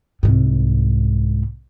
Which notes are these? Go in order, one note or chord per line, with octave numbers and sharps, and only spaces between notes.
C2 G#2